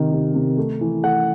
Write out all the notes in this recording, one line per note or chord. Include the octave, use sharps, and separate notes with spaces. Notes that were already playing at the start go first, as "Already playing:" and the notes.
Already playing: C3 D#3
C3
C3
A3
E3
A3 F#5